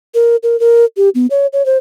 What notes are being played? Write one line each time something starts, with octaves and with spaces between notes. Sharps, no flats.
A#4
A#4
A#4
G4
B3
C#5
C#5
C5